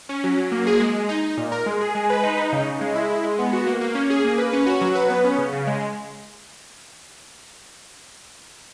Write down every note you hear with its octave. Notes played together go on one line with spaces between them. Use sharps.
C#4
F#3
F#3
A#3
G#4
G#3
G#3
D#4
D#4
A#2
A#4
G#3
G#4
G#3
B4
D#4
D#4
C#3
C#3
G#3
E4
G#3
G#3
B3
F#4
A#3
A#3
C#4
G#4
A#3
B4
C#4
F#4
F#3
B4
B3
C#4
C#3
C#3
G#3